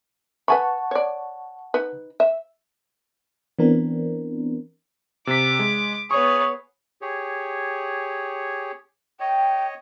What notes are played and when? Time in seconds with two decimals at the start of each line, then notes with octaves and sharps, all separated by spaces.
0.48 B4 F#5 G#5 A5 B5 C#6
0.91 C#5 D5
1.74 D#4 B4
2.20 E5
3.59 E3 B3 C4 D4 A#4
5.27 C3 D6 B6
5.59 G#3
6.11 B3 G#4 C#5 C#6
7.01 G4 G#4 C#5
9.20 C#5 D#5 G5